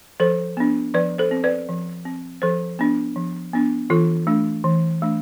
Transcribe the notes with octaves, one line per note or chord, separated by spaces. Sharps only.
F3 A4 C5
B3 D4
F3 B4 D5
A4 C5
C4
B4 D5
F3
C4
F3 A4 C5
B3 D4
F3
B3 D4
E3 F4 A4
A3 D4
E3
A3 D4